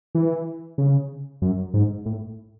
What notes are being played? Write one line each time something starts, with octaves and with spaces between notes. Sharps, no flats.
E3
C#3
F#2
G#2
A2